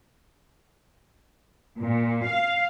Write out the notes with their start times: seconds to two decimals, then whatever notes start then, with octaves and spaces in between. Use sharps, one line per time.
1.80 A#2
2.26 F5